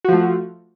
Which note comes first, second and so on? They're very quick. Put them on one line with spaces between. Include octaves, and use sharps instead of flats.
F#4 F3 A3